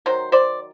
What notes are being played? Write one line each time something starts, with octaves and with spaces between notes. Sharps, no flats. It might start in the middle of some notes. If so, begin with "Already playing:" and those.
D#3 F#3 C5
C5 D5